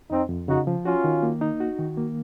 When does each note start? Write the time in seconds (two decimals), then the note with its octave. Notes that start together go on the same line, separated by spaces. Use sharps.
0.10 F2 C4 D#4
0.29 F2
0.48 C#3 D#4 F#4
0.67 F3
0.85 C#4 F4 F#4
1.04 D#3
1.23 A#3
1.41 D#4
1.60 F#4
1.79 D#3
1.97 A#3